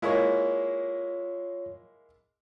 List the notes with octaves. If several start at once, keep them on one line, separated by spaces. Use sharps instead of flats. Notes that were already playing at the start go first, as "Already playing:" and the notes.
G#3 A#3 E4 F4 C#5